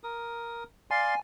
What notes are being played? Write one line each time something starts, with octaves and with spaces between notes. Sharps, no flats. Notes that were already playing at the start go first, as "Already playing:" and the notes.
A#4 D#6
D5 F5 G#5 C6